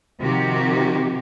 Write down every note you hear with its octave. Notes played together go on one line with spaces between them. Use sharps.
C3 D#3 F3 F#4 G4